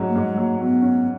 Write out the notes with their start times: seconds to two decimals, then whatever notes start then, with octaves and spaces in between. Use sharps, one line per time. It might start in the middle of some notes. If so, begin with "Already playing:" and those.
Already playing: G#2 F#3 C#4
0.08 A#3
0.15 G#2
0.23 G#3
0.37 F#3 A#3
0.60 F#3 B3
0.82 C#4